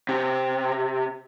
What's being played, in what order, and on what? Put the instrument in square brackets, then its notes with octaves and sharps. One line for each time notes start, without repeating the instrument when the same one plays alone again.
[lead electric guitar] C3